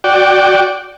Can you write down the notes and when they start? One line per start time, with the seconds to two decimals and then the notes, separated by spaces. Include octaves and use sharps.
0.04 F#4 D5 G5